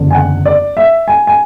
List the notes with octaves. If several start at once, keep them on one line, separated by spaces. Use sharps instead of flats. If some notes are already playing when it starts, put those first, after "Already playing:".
Already playing: F#1 E2 D3
G#5
F#5
D5
E5
G#5
G#5